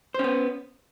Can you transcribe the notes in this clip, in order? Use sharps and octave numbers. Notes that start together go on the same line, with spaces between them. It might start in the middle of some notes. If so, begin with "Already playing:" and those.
B3 C#4 C5